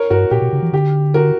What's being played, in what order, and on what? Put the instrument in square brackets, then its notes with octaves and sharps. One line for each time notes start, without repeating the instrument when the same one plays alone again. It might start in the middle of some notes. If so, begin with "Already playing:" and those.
Already playing: [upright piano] A#4 C#5
[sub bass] G2 [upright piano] F#4 A#4
[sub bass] A#2 [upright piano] G4
[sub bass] B2
C#3
E3
[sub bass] D3 [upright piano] G4
[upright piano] F#4 A#4